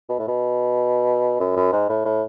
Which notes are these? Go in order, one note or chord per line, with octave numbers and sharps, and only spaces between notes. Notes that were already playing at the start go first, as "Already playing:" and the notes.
B2
A2
B2
F#2
F#2
G#2
A2
A2